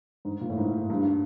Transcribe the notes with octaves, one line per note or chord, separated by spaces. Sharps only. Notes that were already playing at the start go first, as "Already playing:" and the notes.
G#2
A#2
A2
G#2
G2